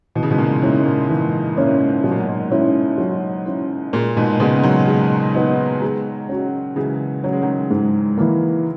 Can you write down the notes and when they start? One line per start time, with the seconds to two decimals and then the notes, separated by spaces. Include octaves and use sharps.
0.16 B2 E3
0.23 C#3
0.30 G#2 B2
0.38 A#2
0.62 G#2 A#3 C#4 E4
0.79 G#2
0.86 A#2
1.09 G#2 E3
1.57 A#2 A#3 C#4 E4
1.68 G#2
1.88 G#2
2.04 B2 F#3
2.11 A#2
2.20 G#2
2.28 A#2
2.51 G#2 C#4 E4
2.98 F#3
3.46 C#4 E4
3.93 A#2 G#3
4.17 G#2 B2
4.40 A#2 C#3 B3 D#4
4.63 D#3 F#3
4.87 G#3
5.35 B3 D#4
5.82 G#3
6.29 C#4 F#4
6.76 C#3 E3 G#3
7.24 F#3 C#4 F#4
7.32 G#3
7.42 D#3 F#3
7.71 G#2
8.18 E3 A#3